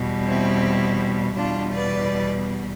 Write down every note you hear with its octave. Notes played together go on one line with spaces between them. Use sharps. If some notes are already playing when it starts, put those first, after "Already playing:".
Already playing: E2 B2 G3
C4 E4
E2 B2 G3 D4 F4
B4 D5